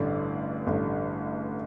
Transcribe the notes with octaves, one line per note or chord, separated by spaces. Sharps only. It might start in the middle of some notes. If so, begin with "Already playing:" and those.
Already playing: A1 G2 D3 D5
A1 G2 D3